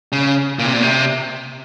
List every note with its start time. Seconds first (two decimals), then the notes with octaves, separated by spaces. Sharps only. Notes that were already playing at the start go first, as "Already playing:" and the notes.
0.12 C#3
0.59 A#2
0.66 C3
0.74 A#2
0.83 C3